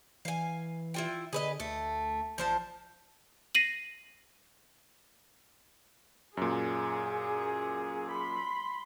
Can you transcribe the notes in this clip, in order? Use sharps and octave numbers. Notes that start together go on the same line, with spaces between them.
E3 F5 G#5
E4 F4 G5
D3 G#4 B4 D#5
D2 A3
A1 F3 C5 A5
A#6 C7 D#7 F#7
F#2 A#2 G#4
B5 C6